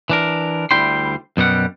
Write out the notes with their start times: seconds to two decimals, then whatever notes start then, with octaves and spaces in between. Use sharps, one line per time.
0.10 E3 D4 A#4
0.71 D2 G3 E4 G5 B5 C6
1.37 F#2 B2 G3 F#5